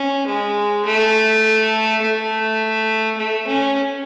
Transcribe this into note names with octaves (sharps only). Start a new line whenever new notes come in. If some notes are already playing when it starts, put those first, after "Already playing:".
Already playing: C#4
G#3
A3
A3
A3
C#4